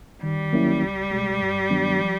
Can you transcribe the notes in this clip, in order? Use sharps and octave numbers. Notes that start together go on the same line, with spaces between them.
D#3 G3
F#3 A#3 C#4 E4
C#2
B2 G#3
G2
D#3 F#3 B3 D4
F3